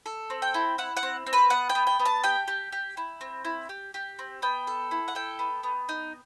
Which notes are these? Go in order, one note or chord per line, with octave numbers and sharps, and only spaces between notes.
A4
C4
G5
E4
E4 F#5
F#5
C4
C4
B4
B3 F#5
G5
B3
G5
B3
A5
G4 G5
G4
G4
E4
C4
E4
G4
G4
C4
B3 G5
A4
E4
F#5
A4 G5
B3
B3
D#4